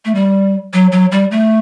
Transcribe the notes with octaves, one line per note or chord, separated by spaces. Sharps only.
A3
G3
F#3
F#3
G3
A3